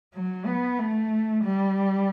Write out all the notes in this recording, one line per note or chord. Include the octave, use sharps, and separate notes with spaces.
F#3
B3
A3
G3